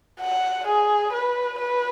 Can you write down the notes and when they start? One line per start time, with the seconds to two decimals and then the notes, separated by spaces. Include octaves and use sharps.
0.20 F#5
0.67 G#4
1.13 B4
1.59 B4